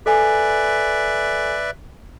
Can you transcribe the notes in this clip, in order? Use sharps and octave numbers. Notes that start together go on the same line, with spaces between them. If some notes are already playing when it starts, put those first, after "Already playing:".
A4 B4 D5 E5 G#5